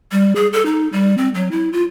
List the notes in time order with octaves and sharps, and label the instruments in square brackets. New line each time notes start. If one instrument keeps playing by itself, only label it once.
[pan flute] G3
G#4
A4
D#4
G3
C4
F#3
E4
F4